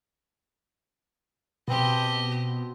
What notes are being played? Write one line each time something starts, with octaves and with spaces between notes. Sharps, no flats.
B2 B3 C4 G4 D#5 A5